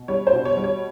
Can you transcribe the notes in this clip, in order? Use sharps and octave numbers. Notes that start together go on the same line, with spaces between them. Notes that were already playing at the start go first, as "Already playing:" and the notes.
Already playing: B2
G3 C#5
C5
B2
C#5
G3
C#5